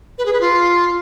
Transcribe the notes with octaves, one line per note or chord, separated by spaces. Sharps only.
B4
G#4
B4
F4